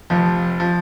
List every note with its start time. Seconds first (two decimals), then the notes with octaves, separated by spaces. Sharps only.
0.10 F1 F2 F3
0.60 F3